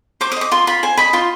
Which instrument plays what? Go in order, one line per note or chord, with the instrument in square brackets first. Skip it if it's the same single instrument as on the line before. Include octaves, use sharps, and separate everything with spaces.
[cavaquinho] C5 D6
D#6
D#5 D6
F4 C6
F4 B5
C5 G#5
D#5 B5
F4 C6